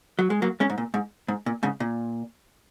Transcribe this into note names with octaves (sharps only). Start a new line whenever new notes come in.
F#3
G#3
F#3 A#3
G#3 C#4
G#2
A#2
G#2
G#2
A#2
G#2 C#3
A#2